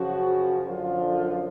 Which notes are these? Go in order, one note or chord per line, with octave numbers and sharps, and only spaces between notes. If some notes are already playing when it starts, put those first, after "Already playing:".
Already playing: F#2 C#3 F3 F#4
F#2 D3 F3 F4